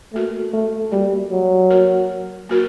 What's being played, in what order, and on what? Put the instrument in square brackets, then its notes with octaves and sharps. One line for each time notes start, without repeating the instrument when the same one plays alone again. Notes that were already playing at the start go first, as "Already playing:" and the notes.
[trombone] A3 [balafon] A#3 F#4 A#4
[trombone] A3
[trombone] G3 [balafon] A#3 F#4 A#4
[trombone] F#3
[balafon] A#3 F#4 A#4
A#3 F#4 A#4